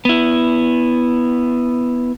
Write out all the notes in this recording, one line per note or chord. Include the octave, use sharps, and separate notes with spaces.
B3 E4